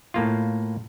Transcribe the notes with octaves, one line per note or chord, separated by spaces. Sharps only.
A2 A#3 F4